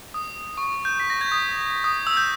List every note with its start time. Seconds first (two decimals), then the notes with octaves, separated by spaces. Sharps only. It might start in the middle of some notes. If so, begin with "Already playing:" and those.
0.14 D#6
0.58 C#6
0.85 G6
1.00 B6
1.10 A#6
1.21 G#6
1.32 D#6
1.84 D#6
2.07 E6
2.17 G6